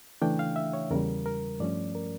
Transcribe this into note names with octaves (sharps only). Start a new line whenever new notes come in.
C#3 E3 A3 D4 G5
F5
E5
C#5
E2 C#3 G3 A#4
A#4
G2 F3 A3 C#4 D5
A#4